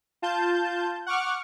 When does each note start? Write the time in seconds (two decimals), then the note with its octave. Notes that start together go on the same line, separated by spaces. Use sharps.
0.22 F4 A5 G6
1.06 F#5 C#6 D6 F6